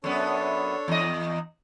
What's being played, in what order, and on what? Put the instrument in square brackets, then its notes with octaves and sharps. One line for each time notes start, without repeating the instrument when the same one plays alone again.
[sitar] F#2 B3 [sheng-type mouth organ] D4 A4 C#5
[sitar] E2 D#5